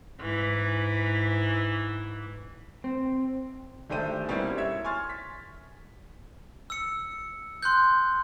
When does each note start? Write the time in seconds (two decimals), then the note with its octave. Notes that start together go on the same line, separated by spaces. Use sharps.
0.20 G#2 E3
2.84 C4
3.90 G#1 A3 D4 G4 C5 D#7
4.28 B2 G3 A#3 C4 C#4 E4
4.57 E4 C#5 E5 G#6
4.84 G#5 C6 C#6 F6 A6
5.09 B6
6.70 E6 C#7
7.63 C6 F#6 G6